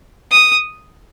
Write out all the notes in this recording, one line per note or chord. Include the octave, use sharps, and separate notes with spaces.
D#6